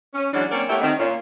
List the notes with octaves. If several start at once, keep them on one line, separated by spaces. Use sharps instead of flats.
C#4
E3 F#3 G#3 C#4 D4
A#3 C4 C#4 A#4 C#5 D5
A3 B3 E4 G4 A#4 C#5
D#3 C4
A#2 C#4